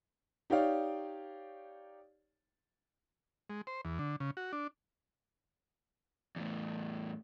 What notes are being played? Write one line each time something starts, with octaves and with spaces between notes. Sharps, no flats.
D#4 G4 C#5 D5 F5
G#3
C5
E2
D3
C#3
F#4
D4
E2 A2